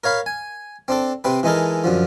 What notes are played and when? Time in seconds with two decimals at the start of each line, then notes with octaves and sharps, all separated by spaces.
0.04 A#4 C#5 F5 B5
0.26 G#5
0.88 C4 D4 A4
1.24 C3 C4 B4
1.43 E3 G#3 D#4 A4 A#4
1.84 F#2 D3 F3